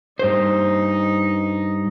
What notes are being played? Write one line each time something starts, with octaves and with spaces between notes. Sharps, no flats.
G2 D#4 C5